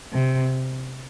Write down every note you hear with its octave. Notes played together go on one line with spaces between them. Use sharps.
C3